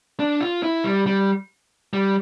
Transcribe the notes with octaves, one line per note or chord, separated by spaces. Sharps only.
D4
F4
E4
G3
G3
G3